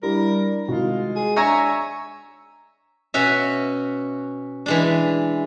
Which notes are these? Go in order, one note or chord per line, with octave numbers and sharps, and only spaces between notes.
G3 D4 E4 G4 A#4
C2 D#3 G#3 F4 F#4
G#4
D4 C#5 E5 G#5 A#5 G#6 A#6
B2 C#4 F#4 E5
E3 G#3 D4